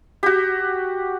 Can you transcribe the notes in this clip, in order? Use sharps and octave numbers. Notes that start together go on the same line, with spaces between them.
F#4 G4